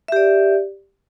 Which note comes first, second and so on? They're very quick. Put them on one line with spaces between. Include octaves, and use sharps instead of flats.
E5 G4 D5